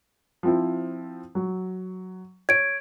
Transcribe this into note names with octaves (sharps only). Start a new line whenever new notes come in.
F3 C4 E4
F#3
C#5 G#6 D7